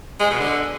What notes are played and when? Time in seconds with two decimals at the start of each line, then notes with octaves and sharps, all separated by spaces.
0.20 G#3
0.30 B2
0.40 D3